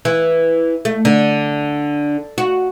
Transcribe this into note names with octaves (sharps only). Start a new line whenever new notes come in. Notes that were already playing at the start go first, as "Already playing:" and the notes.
E3
A3
D3
F#4